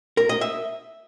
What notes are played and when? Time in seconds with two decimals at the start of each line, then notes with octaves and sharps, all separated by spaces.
0.17 A#4
0.29 D#5
0.41 E5